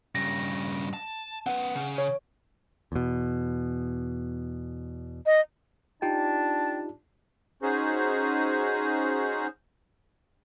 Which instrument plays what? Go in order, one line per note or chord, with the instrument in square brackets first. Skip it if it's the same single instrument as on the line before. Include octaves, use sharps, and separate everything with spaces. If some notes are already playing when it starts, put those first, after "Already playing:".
[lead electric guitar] G2 C#3 [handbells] A#6
[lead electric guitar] A5
[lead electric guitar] C4 B4 [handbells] F#5
[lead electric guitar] C#3
[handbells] C#5
[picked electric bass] E2 B2
[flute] D#5
[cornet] D4 [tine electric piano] D#4 F4 G4 [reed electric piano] G5 [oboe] A5
[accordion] C#4 D#4 F#4 G#4 C5